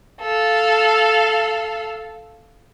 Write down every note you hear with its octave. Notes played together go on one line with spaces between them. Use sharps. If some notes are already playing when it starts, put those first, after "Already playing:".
A4 F5